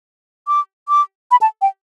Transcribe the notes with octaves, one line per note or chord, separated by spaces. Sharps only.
D6
D6
B5
A5
G5